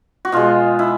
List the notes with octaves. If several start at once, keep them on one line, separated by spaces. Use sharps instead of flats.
F#4
B2 G#3 F4
E4